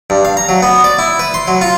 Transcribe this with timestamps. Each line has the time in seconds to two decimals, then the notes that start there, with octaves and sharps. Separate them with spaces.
0.10 G2
0.25 F5
0.37 A#5
0.49 F#3
0.63 B3
0.84 D5
0.99 E4
1.19 B4
1.34 C6
1.48 F#3
1.61 F4